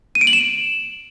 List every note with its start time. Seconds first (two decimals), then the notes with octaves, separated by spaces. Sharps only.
0.15 D#7
0.21 D7
0.27 F#7
0.33 E7